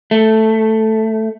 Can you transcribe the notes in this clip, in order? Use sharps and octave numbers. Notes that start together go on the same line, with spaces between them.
A3